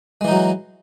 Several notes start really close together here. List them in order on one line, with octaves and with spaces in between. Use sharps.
G#3 E3 D#4 F#3